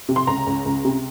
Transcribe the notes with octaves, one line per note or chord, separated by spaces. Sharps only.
C3
C6
C#2 A#5
C#2
C#2
C3